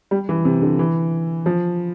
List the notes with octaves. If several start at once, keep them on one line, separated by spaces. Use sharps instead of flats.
G3
E3
C3
D3
E3
F3